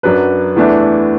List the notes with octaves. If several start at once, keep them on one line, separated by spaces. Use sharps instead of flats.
F#2 F#3 D4 B4
E2 E3 A3 D4 B4